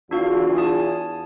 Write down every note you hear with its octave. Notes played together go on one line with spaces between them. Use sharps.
E2 D4 F4 F#4 F5
G#5 A5 D#6